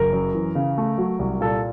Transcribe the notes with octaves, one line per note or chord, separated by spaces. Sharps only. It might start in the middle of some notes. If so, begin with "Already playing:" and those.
Already playing: F#1 A#4
F#2
E3
C#3
A3
F#3
C2
A#2 A4